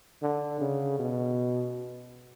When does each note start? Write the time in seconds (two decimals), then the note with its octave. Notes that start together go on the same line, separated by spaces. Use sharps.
0.22 D3
0.60 C#3
0.99 B2